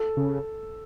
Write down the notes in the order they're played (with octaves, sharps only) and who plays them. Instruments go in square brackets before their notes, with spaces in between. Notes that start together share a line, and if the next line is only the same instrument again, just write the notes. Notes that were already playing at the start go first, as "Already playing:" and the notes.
Already playing: [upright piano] A4
[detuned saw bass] C#3